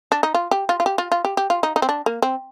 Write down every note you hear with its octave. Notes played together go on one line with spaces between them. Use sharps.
D4
D#4
F4
G4
F4
F4
G4
F4
F4
G4
G4
F4
D#4
D#4
C4
D4
A#3
C4